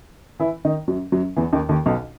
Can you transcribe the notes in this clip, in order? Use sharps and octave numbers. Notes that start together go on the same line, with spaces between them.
E3 E4
D#3 D#4
F#2 F#3
F#2 F#3
E2 E3
D#2 D#3
D#2 D#3
B1 B2